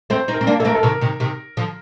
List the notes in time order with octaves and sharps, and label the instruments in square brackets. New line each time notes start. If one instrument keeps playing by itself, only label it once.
[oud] A3 C4 [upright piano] C5
[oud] C4 D#4
[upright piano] A#4
[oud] C4
A#3 D4
[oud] A#3 [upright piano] A4
[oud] A3 C4 [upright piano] A#4
[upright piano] A4
[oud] C3 D#3 [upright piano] A#4
[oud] C3 D#3
C3 D#3
D3 F3